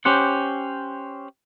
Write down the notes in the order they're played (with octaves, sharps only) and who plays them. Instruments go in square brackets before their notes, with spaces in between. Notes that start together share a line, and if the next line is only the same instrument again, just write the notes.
[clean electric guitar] C#4 G4 C5 F#5